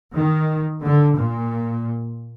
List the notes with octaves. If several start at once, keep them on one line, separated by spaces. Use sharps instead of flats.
D#3
D3
A#2